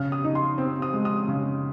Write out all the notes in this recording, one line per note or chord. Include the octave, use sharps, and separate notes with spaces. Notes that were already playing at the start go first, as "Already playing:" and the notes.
Already playing: C#3 F6
D#6
D#4
C6
C4
D#6
G#3
D#6
C#3